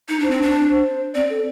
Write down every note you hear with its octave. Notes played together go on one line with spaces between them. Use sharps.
D#4
D4 C5
C4
D4
C5
C4 D5
A4